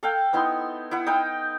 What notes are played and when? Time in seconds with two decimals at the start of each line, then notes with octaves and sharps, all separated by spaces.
0.03 A4 F5 G5
0.33 B3 D#4 E4 C6
0.91 E4 E5 F#5
1.06 D#4 F5 G5